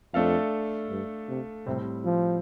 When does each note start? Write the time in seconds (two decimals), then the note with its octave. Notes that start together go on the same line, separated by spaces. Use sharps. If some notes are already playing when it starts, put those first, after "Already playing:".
0.14 F2 A3 D4 A4 F5
0.90 G2
1.29 C3
1.66 A2 C3 G3 C4
2.05 F3